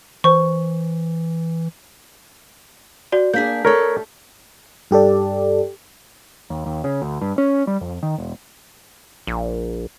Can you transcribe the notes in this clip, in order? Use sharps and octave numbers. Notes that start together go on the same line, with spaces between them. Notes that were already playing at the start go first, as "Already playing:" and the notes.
E3 C5 C#6
F#4 D5
A#3 D4 G#4 G6 B6
A3 A4 A#4 C#5
G2 G4 A4 D5
D#2
D#2
C#3
D2
G2
C#4
G3
F2
D#3
E1
A#1